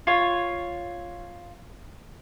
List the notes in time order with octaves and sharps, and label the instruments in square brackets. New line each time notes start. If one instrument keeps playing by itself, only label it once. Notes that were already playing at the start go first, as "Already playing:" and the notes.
[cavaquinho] F4 C#5